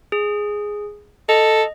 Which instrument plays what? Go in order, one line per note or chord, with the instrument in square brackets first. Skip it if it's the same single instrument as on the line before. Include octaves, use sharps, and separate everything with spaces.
[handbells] G#4
[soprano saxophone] A4 [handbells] D#5